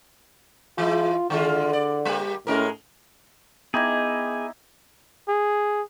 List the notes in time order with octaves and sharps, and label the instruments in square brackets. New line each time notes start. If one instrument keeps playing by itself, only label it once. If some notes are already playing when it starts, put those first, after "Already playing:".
[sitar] E3 G#3 E4 [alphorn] F4
[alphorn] D3 [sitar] D#3 G#3 F4
[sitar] D5
G3 A#3 G4
[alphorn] A2 [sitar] G#3 C#4 A#4
[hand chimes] B3 D6 G#6 [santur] D#4 E4 G5 [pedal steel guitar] G#4
[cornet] G#4